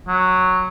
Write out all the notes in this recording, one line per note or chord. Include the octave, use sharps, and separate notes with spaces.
F#3